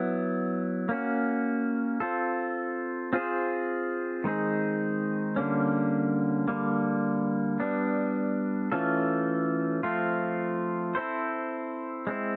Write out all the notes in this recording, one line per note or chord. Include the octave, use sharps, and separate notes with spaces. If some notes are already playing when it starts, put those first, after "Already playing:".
Already playing: F#3 B3 E4
A#3 C#4 F#4
C4 F4 A4
C4 F4 G#4 C5
D#3 G#3 C4 D#4 G#4
D3 G3 A#3 C#4
D3 G3 A#3
G3 B3 D4
E3 A3 C#4 F4 A4
F3 A3 C4 F4
C4 E4 A4 C5
G#3 C4 E4